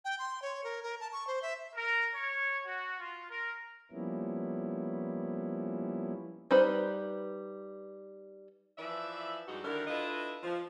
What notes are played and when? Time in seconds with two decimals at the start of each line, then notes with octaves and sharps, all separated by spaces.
0.05 G5
0.19 C6
0.42 C#5
0.64 A#4
0.83 A#4
1.00 A5
1.13 C#6
1.27 C5
1.42 E5
1.76 A#4
2.15 C#5
2.66 F#4
3.00 F4
3.30 A#4
3.92 F3 G3 A#3 B3 C#4 E4
6.51 G3 D#4 B4 C5 B5
8.78 E3 F3 B4 D5 E5
9.48 G2 G3 G#3 D#4 F#4
9.65 D3 D#3 D4 E4 A#4
9.87 D4 E4 F4 A4 B4 D#5
10.43 F3